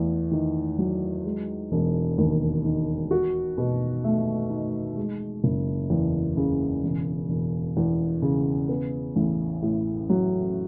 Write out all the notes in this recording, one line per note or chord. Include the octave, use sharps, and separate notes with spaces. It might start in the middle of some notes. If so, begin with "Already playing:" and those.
Already playing: E2 A3
D#3
F#3
G#3
E1
D#2
D#3
F#4
B2
A3
D#4
G#3
F#1
E2
C#3
E1
E1
E2
C#3
B3
A1
A2
F#3